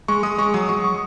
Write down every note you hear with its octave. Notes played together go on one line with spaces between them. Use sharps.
G#3 C#6
G#3 D#6
G#3 C#6
F#3 D#6
F#3 C#6
C#6